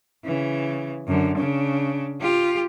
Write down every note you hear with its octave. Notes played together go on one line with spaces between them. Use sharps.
C#3 E3
F#2 D3
C#3 D4
F4 G4